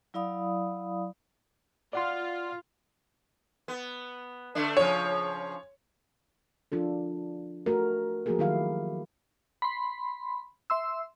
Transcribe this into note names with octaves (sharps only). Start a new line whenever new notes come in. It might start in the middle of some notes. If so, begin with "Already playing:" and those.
F#3 E4 D5 F5 B5 D#6
F4 D5 F#5 C6
B3
D3 A3 D4
C#3 F3 C#5
F3 D4 F4 A4
A3 F#4 A4 A#4
F3 A3 A#3 F#4 G#4 A#4
D#3 F#3 E4 G4 F5
B5 C6
E5 C6 E6